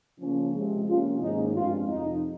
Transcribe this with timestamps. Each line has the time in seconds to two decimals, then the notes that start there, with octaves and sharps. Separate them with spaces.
0.19 C#3 F3 A#3 C#4
0.53 C3 F3 G#3
0.87 C3 F3 A#3 C#4 F4
1.21 G#2 D#3 A#3 C#4 D#4
1.54 G2 F3 G#3 C4 F4
1.88 F2 C3 F3 D#4